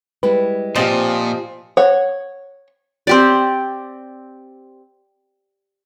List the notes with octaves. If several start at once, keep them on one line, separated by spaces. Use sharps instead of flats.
G3 G#3 E4 B4
A#2 F3 C4 F4 G4 D#5 F5
C#5 F#5
C4 G4 D5